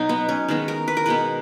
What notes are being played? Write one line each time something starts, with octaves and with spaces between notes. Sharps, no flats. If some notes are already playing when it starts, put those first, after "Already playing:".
Already playing: B2 F#3 D#4
B3
C#4
D#3 G#3 B3
A#4
B4
A#4
B2 G#3 B3 B4